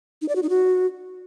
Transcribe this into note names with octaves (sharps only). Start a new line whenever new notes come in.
D#4
D5
F#4
D#4
F#4